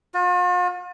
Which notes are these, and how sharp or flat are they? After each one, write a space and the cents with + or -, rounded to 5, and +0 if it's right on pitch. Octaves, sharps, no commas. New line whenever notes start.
F4 +45